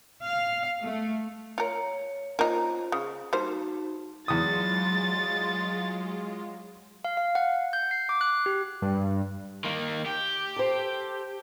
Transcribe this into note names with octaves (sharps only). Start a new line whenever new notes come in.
F5
A3
F4 A#4 C#5 C#7
A#3 C#4 D#4 F4 C5
C#3 G#4
G3 A#3 D#4 F#4 C5 A5
E2 F#3 G#3 F4 D#6 A6
F5
F5
F#5
G6
C7
D6
F#6
G4
G2
D#3 A#3
G4
A4 C5